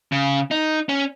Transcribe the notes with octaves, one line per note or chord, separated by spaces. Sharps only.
C#3
D#4
C#4